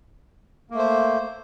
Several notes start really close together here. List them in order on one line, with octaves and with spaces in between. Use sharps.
A#3 A3 C5